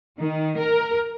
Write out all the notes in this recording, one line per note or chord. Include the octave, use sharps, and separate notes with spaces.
D#3
A#4